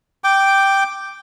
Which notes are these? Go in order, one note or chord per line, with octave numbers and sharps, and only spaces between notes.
G5 D6